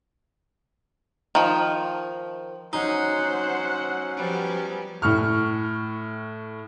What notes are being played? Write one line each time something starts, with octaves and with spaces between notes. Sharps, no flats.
D#3 F3
F#3 C#4 D#4 C5 F#5
F3 G3 B3
A2 C#6 F6